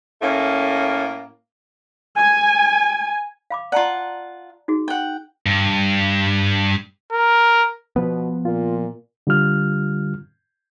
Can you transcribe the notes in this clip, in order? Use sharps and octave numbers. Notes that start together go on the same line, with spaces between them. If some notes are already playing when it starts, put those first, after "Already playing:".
A2 A3 A#3 C#4
G#5
F5 B5 D6
F4 D5 F#5 A5 A#5
D#4 F#4 G#4
F#5 G5
G2
A#4
B2 F3 B3 B4
A#2 F4
D3 G3 F4 F6